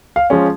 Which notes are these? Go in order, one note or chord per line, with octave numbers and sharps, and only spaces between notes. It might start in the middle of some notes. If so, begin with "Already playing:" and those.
F5
F3 G#3 C#4